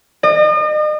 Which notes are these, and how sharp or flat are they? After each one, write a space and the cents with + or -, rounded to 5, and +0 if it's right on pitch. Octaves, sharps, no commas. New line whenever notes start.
D#5 -40